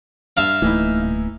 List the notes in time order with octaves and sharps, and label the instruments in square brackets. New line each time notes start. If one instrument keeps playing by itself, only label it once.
[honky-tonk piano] G2 [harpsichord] E5 F5
[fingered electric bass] D1 A3 A#3 [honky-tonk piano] E3 D#4 E4